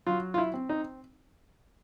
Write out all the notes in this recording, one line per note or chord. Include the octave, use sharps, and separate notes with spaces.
F#3 F4
F4
E4
C4
D#4